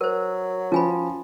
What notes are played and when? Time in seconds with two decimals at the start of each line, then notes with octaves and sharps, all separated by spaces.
0.01 F#3 A#4 C5
0.72 F3 C#4 G#5 B5